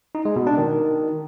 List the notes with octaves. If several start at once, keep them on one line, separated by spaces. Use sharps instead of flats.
D#4
G#3
B2
D4
D#3